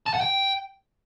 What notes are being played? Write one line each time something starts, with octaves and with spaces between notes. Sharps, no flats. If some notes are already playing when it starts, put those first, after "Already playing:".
A5
F#5
G5